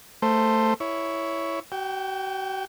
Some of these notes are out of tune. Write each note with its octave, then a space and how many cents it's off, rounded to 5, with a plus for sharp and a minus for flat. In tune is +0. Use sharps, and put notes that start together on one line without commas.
A3 +15 C5 +0
E4 +0 C#5 +10
F#4 +40 G5 +0